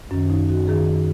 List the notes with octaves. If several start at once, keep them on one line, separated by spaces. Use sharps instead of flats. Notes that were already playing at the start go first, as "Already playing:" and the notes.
F#2 D#3 C#4
D#4
F#4
F#2 D#3 G#4